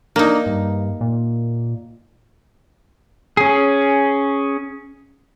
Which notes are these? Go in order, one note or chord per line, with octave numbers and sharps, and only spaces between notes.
A#3 D4 D#4
G2
A#2
C#4 G#4